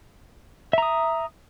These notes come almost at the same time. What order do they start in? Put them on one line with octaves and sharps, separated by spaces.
E5 A#5 D#6